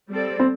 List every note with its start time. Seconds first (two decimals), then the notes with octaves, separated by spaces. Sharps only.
0.10 G3 C4 A4 D5
0.40 C4